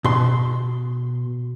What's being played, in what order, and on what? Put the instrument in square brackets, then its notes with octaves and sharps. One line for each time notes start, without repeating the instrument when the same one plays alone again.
[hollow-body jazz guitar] B2 C6